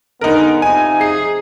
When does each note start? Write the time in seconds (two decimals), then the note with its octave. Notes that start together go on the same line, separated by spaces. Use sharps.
0.21 D3 G#3 B3 D#4 A#4
0.62 C3 F3 D#4 G#5
1.01 G#4 C7